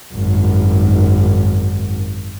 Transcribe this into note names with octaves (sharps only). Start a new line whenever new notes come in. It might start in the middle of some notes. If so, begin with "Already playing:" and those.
G#1 F#2